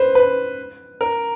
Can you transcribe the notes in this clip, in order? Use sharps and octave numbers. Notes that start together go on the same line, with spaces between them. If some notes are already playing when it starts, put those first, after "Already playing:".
Already playing: B4 C5
B4
A#4